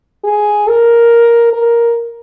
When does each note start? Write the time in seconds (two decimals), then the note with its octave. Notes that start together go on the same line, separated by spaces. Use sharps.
0.24 G#4
0.68 A#4
1.53 A#4